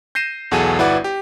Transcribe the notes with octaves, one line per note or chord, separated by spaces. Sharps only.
G6 A#6 C7 D#7 E7
B1 E2 F#4 G#4 A4 D#7
G1 E4 F#4 B4 D5 F#5
G4